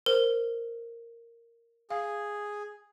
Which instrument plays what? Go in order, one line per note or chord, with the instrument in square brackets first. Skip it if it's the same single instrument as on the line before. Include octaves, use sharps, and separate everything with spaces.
[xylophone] A#4 [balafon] C5
[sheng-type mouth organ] G#4 [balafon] F5